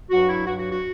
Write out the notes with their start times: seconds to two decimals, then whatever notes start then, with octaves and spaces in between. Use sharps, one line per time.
0.10 G2 F#3 F#4
0.28 E4
0.45 G2 F#3 F#4
0.57 F#4
0.70 F#4